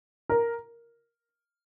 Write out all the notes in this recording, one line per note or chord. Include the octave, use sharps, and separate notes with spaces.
A#4